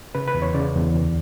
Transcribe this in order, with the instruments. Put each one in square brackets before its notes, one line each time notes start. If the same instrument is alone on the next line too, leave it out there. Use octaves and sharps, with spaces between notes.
[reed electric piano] C#3 B4
B4
E2
C#5
C#3 D5
E2
D2